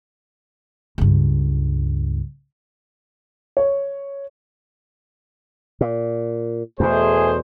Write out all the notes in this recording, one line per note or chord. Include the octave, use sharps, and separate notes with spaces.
C#2 G2
C#5
A#2
E2 B2 A3 G#4 C5